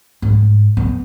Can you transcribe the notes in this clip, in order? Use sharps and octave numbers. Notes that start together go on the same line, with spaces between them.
G#2
B3